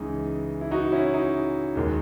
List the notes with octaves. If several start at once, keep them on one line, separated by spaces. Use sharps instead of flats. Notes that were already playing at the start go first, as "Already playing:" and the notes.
Already playing: C#2 C#3 E3 G#3 D#4
E4
D#4 F#4
C#4 E4
D#4
D#2 D#3 G#3